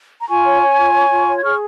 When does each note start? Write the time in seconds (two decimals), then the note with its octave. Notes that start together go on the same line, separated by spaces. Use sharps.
0.20 A#5
0.29 F4 G#5 C#6
0.45 C#5
0.62 C#5
0.78 F4
0.94 C#5
1.11 F4
1.27 C#5
1.38 G#6
1.43 G#4 C#6 F6